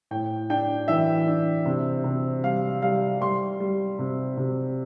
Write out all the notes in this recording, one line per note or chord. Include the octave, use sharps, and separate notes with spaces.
A2 G5
D4 G5
E3 E5
D4
C3
C3
G3 F5
G3 F5
G3 C6
G3
C3
C3